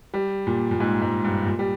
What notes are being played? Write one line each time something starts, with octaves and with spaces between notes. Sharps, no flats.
G3
A#2
A#2
G#2
G#2
G2
A#2
G3